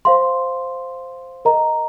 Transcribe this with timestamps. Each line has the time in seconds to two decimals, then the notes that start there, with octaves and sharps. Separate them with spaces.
0.05 C5 F5 C6
1.45 A#4 D#5 A#5